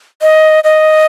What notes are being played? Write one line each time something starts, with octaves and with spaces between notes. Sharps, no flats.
D#5
D#5